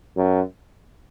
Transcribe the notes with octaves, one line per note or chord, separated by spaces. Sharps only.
F#2